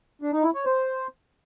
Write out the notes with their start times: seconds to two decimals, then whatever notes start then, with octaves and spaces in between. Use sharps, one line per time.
0.22 D4
0.33 D#4
0.44 E4
0.54 C#5
0.65 C5